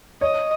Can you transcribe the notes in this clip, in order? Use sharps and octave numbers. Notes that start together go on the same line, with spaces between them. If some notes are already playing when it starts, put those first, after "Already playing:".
C#5 D#5